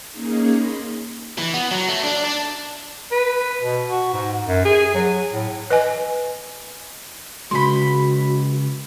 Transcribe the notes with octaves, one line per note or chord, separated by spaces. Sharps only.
A#3 C#4 D#4 G#4
D#5 B5 C6
E3
B3
F#3
A3
D4
D4
B4
B2
F#4
G#2
F#2
G#4
F#3
A2
B4 D#5 G#5
C#3 G#3 F#4 B5 C6